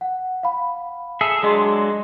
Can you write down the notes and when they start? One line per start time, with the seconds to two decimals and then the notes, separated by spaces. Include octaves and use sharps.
0.01 F#5
0.43 F5 B5
1.21 G#4 A4 E5
1.42 F#3 G#3 D4 G#4 D#5 C6